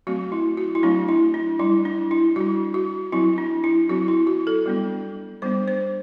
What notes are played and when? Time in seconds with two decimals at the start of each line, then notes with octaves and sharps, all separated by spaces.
0.07 F#3 A3 C4 F#4
0.32 E4
0.57 F#4
0.75 E4
0.83 F#3 A3 C4 D4
1.09 E4
1.34 D4
1.59 G3 D4 E4
1.85 D4
2.11 E4
2.36 G3 D4 F#4
2.74 F#4
3.12 F#3 C4 E4
3.38 D4
3.64 E4
3.89 F#3 C4 F#4
4.08 E4
4.27 F#4
4.47 A4
4.66 G3 B3 D4
5.42 G3 B3 D4 C5
5.68 C5